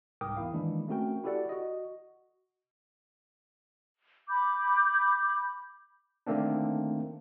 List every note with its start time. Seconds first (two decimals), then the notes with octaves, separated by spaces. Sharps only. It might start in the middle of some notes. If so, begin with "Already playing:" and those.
0.21 C2 G#2 A#4 G5 D6 D#6
0.37 E2 E4 F5
0.53 D#3 E3 G#3 A#3 D4 E4
0.88 A3 C4 C#4 F#4 A#4 G5
1.24 E4 F#4 G4 A4 D5 F#5
1.49 F#4 D#5
4.29 B5 D6 G6
6.27 D3 D#3 A3 A#3 C4 D4